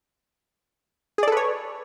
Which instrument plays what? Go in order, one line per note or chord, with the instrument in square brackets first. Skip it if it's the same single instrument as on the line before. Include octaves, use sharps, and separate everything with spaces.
[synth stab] G#4
D5
A4
B4
C#5